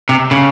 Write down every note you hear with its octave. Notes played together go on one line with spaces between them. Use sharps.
C3
C#3